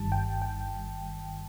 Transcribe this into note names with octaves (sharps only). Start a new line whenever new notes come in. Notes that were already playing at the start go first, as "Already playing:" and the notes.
Already playing: G1 G2 D#3 G3 A5
G5
G5